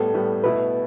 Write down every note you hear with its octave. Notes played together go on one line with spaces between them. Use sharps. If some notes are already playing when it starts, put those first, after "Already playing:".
Already playing: A2 G3 B3 A4
A2 G3 B3
B2 A3 E4 B4